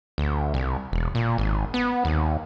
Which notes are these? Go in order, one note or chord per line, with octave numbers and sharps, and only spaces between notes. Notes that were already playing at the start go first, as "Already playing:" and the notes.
D2
C2
E1
A#2
G#1
B3
D#2